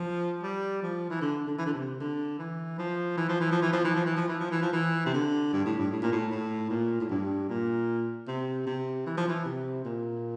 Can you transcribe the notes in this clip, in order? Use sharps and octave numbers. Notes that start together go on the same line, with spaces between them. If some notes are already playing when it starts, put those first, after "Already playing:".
Already playing: F3
G3
F3
E3
D3
D3
E3
D3
C3
D3
E3
F3
E3
F3
E3
F3
E3
F3
E3
F3
E3
F3
E3
F3
E3
F3
E3
C3
D3
G2
A2
G2
A2
A#2
A2
A2
A#2
A2
G2
A#2
C3
C3
E3
F3
E3
C3
A#2